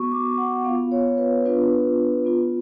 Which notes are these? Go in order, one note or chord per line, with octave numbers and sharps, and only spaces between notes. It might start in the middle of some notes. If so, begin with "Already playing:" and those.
Already playing: B3 F#4 C#6
D6
F#5
B3 F4 F5
C#5
B4
B3 D4 F4 B4
B3 F4